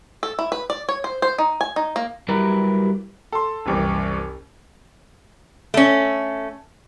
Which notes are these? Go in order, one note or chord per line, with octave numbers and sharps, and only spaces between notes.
A4
E4
B4
D5
C#5
C5
C5
D#4
G#5
D#4
A#3
F#3 G3 E4 G4 A#4 B4
A4 C6
F#1 C2 E3
A3 C#4